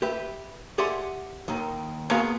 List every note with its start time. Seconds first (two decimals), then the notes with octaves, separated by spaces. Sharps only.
0.02 G4 B4 E5
0.78 G4 G#4 D5 E5 F#5 C6
1.48 D#2 D#3
2.11 G#3 A#3 B3 F#4 G#4 F5